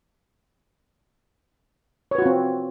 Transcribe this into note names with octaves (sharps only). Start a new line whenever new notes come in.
C4 F4 F#4 B4 C#5